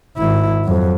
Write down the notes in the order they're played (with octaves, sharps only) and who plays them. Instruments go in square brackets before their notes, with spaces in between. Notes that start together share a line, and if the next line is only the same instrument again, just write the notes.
[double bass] G#1 E4
F2 F#3